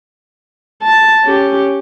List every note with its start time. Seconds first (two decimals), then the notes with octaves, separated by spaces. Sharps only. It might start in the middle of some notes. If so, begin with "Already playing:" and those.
0.82 A5
1.25 C#4 G4